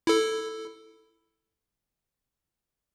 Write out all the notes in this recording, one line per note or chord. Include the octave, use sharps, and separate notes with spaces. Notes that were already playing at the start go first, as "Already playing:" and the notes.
E4 A4